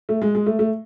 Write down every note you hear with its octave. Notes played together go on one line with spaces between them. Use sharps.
A3
G#3
G#3
A3
A3